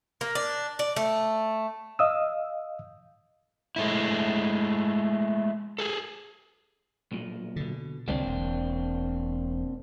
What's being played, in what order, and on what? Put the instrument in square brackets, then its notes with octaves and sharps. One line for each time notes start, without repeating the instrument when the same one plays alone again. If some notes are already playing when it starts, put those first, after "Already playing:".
[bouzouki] A#3
D4
D5
A3
[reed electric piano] D#5 F5 D#6 E6
[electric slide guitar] G#3 A3 E4
G#4 A4
[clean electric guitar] B1 A#2
[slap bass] B2 D3
[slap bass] C2 D3 G3 [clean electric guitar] A#3 C4 D4
[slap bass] E1